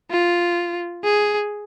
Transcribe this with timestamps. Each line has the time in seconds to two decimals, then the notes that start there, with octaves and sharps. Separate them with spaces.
0.11 F4
1.04 G#4